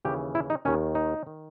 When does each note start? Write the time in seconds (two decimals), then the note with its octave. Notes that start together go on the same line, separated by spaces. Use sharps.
0.05 D#2 C#3 E3 G4
0.35 E4
0.50 D#4
0.65 D#2 D#3 C#4
0.95 D#4
1.27 D#3